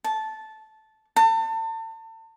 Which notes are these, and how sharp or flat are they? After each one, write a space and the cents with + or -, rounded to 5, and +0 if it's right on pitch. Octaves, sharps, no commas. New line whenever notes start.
A5 -10
A5 +35